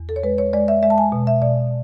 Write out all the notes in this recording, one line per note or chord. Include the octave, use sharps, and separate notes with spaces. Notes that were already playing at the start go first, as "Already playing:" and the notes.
Already playing: E2
A4
C#5
G#3 B4
C#5
G#3 D5
E5
G#3 E5
A5
G#5
B2
E5
B2 D5